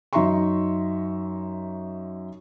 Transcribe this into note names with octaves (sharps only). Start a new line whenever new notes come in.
F#2 D#4 E5 A#5 C6 C#6